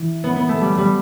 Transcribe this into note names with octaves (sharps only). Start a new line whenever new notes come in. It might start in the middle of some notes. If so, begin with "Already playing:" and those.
Already playing: E3
B3
B3
A3
G3
G3